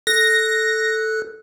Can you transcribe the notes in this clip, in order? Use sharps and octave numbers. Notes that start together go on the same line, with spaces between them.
A4 F#6 A#6